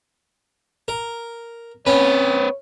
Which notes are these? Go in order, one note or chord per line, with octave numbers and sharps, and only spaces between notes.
A#4
C4 C#4 B4 C#5